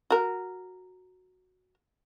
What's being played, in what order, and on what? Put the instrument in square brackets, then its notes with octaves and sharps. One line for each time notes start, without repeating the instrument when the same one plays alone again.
[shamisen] F#4 A#4